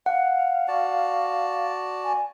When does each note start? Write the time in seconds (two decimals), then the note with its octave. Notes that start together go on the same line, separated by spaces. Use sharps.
0.06 F5 F#5
0.68 F#4 D5 A5
2.04 G#5